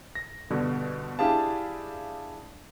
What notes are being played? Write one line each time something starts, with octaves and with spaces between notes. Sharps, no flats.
A#6
G2 B2 D3
D4 E4 G4 G#4 F5 A5